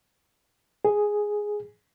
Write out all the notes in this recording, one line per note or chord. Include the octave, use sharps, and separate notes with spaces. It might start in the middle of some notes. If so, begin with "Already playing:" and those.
G#4